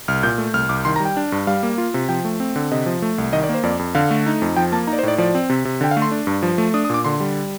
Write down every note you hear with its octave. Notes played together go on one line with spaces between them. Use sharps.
C2 F6
A#2 G6
A3
C2 F6
C2 D6
D#3 C6
A#5
G3
G5
D4
G2
G3 F5
A#3
F4
C3
F3 G5
A3
C4
D3
C3 D#5
F3
A3
C2
D#3 D#5
D5
A#3 C5
F2 D5
F2
D3 F5
A3
D#4
F2
F3 G5
A#3 A5
D#4 A#5
D5
C5
A2 D5
F3 D5
C4
C3
C3
D3 G5
F5
A3
C6
D4
G2
F3
A3
D4 D#6
D#6
A#2 D6
D3 C6
G3